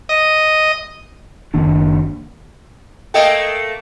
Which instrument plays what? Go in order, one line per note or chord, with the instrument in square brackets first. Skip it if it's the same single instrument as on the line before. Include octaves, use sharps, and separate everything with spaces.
[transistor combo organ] D#5
[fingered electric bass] F#1 D#3 A#3 D4
[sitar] A3 A#3 A4 [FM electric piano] D#5 G5